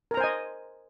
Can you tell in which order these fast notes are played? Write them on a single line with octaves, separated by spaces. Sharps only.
A#4 A#5 C5 G#5 D#5